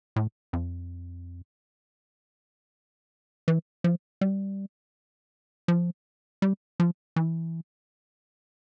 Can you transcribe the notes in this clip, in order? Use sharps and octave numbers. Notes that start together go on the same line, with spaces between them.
A2
F2
E3
F3
G3
F3
G3
F3
E3